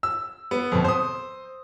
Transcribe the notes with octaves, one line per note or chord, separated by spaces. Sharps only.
E6
B3
F2 B2
C5 D#6